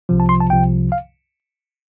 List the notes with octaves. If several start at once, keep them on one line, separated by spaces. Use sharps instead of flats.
C2 C3 F3
A5
C6
A5
C2 C3 F3 G5
F5